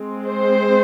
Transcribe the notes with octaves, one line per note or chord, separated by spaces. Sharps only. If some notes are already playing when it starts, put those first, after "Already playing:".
Already playing: G#3 C4
C5